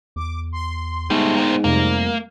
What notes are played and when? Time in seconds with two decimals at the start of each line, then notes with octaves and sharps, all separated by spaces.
0.16 E2 D6
0.52 C6
1.10 G#2 G3 A3 B3
1.37 A#3 C4
1.64 F2 C3 G3 A3 A#3